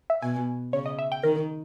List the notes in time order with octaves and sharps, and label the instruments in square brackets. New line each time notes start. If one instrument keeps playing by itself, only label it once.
[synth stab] E5
[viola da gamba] B2 [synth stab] G#5
[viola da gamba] C#3 [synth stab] C#5
[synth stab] D#5
E5
G5
[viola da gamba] D#3 [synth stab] A#4